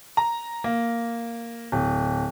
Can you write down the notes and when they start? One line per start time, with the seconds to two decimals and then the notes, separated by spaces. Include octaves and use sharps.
0.17 A#5
0.64 A#3
1.72 D1